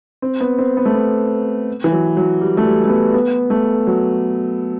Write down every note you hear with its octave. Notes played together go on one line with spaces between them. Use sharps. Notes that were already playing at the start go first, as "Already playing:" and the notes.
C4
B3
C4
B3
A3
B3
E3
F#3
F#3
G3
A3
G3
A3
B3
B3
A3
F#3